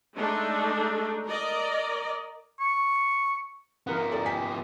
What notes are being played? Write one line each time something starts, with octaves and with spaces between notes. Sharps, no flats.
G#3 A3 D4 D#4 A4
A#4 D5 D#5
C#6
F3 B3 A#4 F#5
A4 D5 A#5
G5 G#5 B6